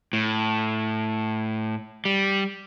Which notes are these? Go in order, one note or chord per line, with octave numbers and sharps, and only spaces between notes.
A2
G3